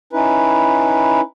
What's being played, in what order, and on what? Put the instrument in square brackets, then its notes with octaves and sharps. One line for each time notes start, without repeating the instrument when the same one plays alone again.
[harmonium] C#4 D#4 E4 B4